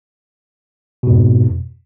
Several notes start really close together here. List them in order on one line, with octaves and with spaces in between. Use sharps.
B2 G#2 F2